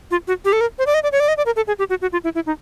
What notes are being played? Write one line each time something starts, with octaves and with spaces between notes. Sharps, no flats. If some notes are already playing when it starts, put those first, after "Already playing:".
F4
F#4
G4
A4
A#4
C5
D5
D#5
D5
C#5
D5
D#5
D5
A#4
A4
G#4
G4
F#4
F#4
F4
E4
E4
D#4